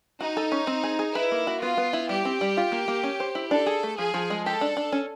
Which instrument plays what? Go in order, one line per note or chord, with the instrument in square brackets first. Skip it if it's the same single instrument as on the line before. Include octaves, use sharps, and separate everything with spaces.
[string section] D#4 [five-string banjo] F#4
[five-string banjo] A4
C#4
C4
G#4
G#4
[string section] E4 [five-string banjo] B4
[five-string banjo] A#3
F#4
[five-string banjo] B3 [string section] F4
[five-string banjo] B3
E4
[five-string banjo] G3 [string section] G4
[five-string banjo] C4
G3
F4
A#3
A#3
C#4
C5
E4
[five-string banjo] D4 [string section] A4
[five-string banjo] G#4
A3
[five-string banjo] F3 [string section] G#4
[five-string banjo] F3
G#3
[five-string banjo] G4 [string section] A4
[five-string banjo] D4
D4
C#4